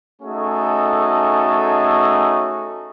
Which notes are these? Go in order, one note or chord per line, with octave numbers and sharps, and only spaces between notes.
A3 C#4 D#4 F#4 G#4 A4